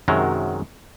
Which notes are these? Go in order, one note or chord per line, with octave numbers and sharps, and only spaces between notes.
F#2 C3 D#3 F#3 G#3 A#5